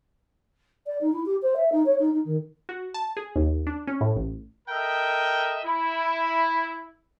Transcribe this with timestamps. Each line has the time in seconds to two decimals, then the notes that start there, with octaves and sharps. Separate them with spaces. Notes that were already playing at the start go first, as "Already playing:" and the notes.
0.86 D5
1.01 D#4
1.12 E4
1.25 G4
1.42 C5
1.56 E5
1.72 D#4
1.85 C#5
1.99 D#4
2.12 D#4
2.25 D#3
2.69 F#4
2.94 A5
3.17 G#4
3.36 D#2
3.67 D4
3.87 C#4
4.01 A2
4.16 A1
4.68 A4 A#4 D#5 E5 G5
5.63 E4